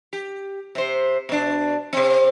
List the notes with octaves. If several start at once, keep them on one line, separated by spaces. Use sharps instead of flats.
G4
C3 C5
B2 D4
C3 C4